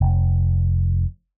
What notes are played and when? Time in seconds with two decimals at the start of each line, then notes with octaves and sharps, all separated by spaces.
0.01 F1